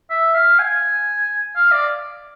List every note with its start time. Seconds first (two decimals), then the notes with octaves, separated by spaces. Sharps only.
0.10 E5
0.34 F5
0.59 G#5
1.56 F5
1.72 D5